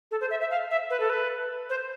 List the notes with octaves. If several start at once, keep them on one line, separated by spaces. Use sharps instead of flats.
A4
C5
E5
E5
F5
E5
B4
A4
B4
C5